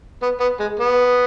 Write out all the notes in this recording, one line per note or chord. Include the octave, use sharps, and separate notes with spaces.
B3
B3
G#3
B3